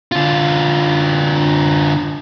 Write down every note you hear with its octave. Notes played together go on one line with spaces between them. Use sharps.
D3 F4